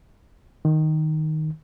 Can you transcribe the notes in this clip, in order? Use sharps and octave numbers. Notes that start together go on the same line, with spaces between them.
D#3